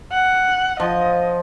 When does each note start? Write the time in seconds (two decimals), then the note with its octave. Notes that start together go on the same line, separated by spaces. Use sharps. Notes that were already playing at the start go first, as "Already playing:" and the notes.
0.12 F#5
0.80 F3 D#5